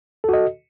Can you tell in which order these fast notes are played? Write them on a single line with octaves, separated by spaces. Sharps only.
A4 F#4 D#5